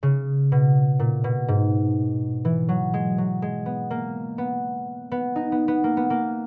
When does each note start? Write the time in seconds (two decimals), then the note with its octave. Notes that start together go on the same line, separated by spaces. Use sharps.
0.03 C#3
0.52 B2
0.99 A#2
1.24 B2
1.48 G#2
2.45 E3
2.69 F#3
2.94 G#3
3.18 F#3
3.42 G#3
3.66 B3
3.90 A#3
4.38 B3
5.11 B3
5.36 D#4
5.52 B3
5.68 B3
5.84 A#3
5.97 B3
6.10 A#3